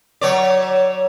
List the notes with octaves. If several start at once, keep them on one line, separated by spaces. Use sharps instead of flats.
F#3 C#5 D5